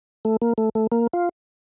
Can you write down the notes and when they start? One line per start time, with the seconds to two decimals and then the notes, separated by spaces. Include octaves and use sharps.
0.25 A3
0.42 A#3
0.58 A3
0.75 A3
0.92 A#3
1.13 F4